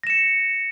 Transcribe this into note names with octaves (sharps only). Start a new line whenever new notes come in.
A#6 C#7 E7